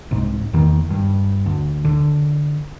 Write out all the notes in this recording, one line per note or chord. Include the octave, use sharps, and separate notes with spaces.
C2 G#2
E2 D#3
G2
D2
D3